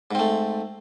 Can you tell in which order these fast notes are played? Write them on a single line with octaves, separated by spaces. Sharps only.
G#2 C4 A3